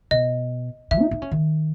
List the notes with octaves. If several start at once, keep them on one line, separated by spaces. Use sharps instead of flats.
B2 D#5
E3 E5
D#4
D#4
C#4
D#3